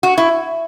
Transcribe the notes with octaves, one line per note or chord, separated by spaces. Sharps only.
F#4
E4